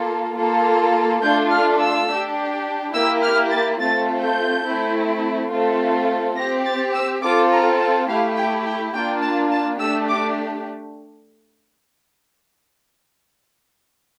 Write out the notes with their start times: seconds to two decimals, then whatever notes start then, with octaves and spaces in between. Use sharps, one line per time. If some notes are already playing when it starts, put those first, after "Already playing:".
Already playing: A#3 F4 A4
0.37 A#3 F4 A4
1.22 A3 D4 F4 A4 G6
1.51 F6
1.79 E6
2.09 D4 G4
2.94 A#3 E4 G4 E6
3.23 F6
3.50 A6
3.79 A3 C4 F4 A4 A6
4.22 G6
4.65 A3 C4 E4
5.51 A3 C4 F4 A4
6.37 C4 G4 A#6
6.65 A6
6.94 E6
7.22 C4 F4 A4 D6
7.51 A#5
7.79 A5
8.08 A3 E4 G4 F5
8.36 G5
8.65 G5
8.94 A#3 D4 F4 G5
9.22 A5
9.51 A5
9.79 A3 D4 G4 E6
10.08 D6